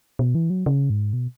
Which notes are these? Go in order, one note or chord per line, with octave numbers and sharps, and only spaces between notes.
B2
E3
F#3
C#3
G#2
B2